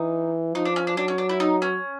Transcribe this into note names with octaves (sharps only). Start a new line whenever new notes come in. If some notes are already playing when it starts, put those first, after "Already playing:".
Already playing: E3 D#4
F3 D#4
D4
C#4
D4
F#3 D4
C#4
D4
E4
D#4
C#4